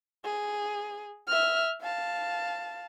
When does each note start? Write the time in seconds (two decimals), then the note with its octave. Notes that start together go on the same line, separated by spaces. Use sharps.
0.24 G#4
1.28 E5 F6
1.82 F5 A5